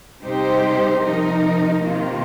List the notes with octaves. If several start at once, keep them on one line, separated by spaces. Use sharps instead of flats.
C3 G3 D#4 G4 C5
C3 F3 D#4 A#4
C3 D#3 A#3 F4